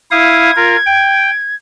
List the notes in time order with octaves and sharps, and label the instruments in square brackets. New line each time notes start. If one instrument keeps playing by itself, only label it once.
[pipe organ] E4 F5 D#6 [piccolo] G#6
[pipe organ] F4 A#4
G5